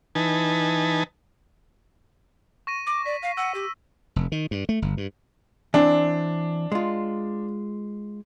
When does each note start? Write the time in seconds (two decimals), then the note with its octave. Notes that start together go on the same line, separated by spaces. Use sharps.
0.15 E3 D#4 B4 G#5 A5
2.67 C#6 A#6 D#7
2.87 D6
3.06 D5 B6
3.23 F5
3.37 F#5 E6 D#7
3.55 G4
4.16 F1
4.32 D#3
4.51 G2
4.69 A3
4.82 G1
4.97 G2
5.74 E3 C4 D4 D5
6.72 G#3 F4